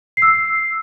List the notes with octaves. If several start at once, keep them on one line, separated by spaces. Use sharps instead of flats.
C7
E6
C7